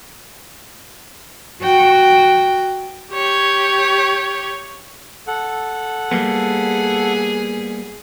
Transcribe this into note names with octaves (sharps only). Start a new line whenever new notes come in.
F#4 G5
G4 C#5
A4 F#5
G3 A#3 B3 G#4